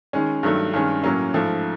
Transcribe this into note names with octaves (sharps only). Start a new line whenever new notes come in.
D#3 G#3 C#4
G2 D#3 F#3 A3
G2 D#3 G#3 C#4
A2 F#3 A#3 C#4
G#2 F3 A3